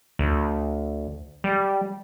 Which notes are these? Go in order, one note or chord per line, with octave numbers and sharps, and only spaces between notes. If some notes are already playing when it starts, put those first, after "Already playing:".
D2
G3